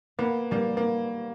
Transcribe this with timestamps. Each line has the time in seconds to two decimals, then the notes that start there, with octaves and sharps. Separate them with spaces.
0.18 A#3 B3
0.51 G3 A#3
0.77 A#3